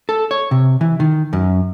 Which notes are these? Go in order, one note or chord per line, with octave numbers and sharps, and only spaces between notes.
A4
C#5
C3
E3
D#3
F#2